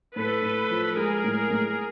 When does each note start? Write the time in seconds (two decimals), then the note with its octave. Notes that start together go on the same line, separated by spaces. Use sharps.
0.16 A2 A4 B4
0.42 A2
0.70 F3
0.97 G#3 G#4 A#4
1.24 A2
1.51 A2